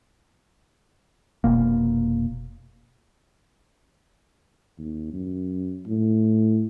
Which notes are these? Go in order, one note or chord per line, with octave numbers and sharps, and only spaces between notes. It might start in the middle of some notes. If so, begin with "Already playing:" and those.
F1 B2 A#3
D#2
F#2
A2